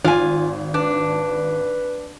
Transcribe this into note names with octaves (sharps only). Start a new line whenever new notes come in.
G#1 F4 G#5
D4 B4